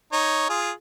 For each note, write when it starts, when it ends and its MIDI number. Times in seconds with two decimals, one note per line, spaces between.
0.12 0.45 63
0.12 0.45 73
0.49 0.71 65
0.49 0.71 68